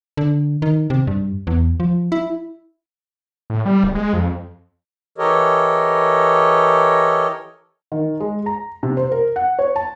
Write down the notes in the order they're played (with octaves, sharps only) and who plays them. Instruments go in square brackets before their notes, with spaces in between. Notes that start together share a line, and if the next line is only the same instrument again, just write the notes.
[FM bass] D3
D#3
C3
G2
E2
F3
E4
[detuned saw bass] A2
G3
D1
G#3
F2
[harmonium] E3 G4 A4 A#4 C#5 D#5
[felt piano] D#3
G#3
A#5
C3
C5
A#4
F#5
C#5
A5